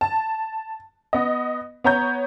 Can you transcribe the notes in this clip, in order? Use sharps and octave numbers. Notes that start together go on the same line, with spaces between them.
A5
B3 D#5
B3 C#5 A#5 G6